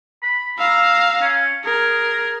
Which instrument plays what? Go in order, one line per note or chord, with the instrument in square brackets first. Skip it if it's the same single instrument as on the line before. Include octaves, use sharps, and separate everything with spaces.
[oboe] B5
[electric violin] F5 A#5 [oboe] E6
[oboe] C#4
[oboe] G#4 [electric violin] A#4